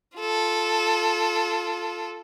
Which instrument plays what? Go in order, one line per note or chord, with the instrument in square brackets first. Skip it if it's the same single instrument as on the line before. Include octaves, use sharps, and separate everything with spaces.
[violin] F4 A4